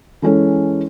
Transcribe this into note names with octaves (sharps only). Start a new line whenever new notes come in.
E3 G#3 C#4 A4